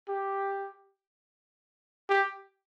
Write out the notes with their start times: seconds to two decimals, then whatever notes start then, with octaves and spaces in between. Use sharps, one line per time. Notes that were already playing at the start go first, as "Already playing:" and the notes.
0.09 G4
2.09 G4